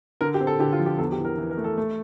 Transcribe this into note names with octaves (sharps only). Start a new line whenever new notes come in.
D3 A#4
G4
C4
A4
D3 G4
F4
F3
G4
E2 A4
G4
E3
A#4
E3
A#4
A3
A4
A3